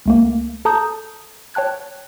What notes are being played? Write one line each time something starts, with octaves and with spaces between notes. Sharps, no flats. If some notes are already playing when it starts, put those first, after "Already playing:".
C#2 A3 A#3
A4 A5 A#5 D#6 E6 G6
C#5 G5 A5 F#6 G#6